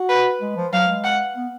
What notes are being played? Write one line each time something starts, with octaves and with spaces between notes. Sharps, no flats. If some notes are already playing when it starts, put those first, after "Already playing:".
Already playing: F#4
B4
G#3
F3
F#3 F5
G#3
F#5
B3